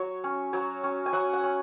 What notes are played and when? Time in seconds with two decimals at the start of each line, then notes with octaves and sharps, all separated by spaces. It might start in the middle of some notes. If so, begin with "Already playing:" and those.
Already playing: F#3 C#5
0.24 C#4
0.53 F#3 C#5
0.84 C#4
1.06 G#5
1.13 F#3 F#5
1.33 F#5
1.43 C#4